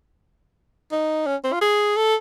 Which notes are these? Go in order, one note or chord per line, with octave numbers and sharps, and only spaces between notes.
D#4
C#4
C4
F4
G#4
A4